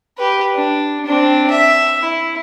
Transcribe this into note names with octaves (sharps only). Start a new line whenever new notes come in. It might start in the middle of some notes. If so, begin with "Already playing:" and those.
G4 B4
D4
C4 D4
E5
E4